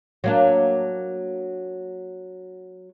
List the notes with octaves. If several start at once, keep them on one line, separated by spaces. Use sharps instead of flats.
F#3 A#3 D4